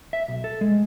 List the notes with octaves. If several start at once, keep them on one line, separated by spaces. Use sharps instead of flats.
E5
B1
A4
G#3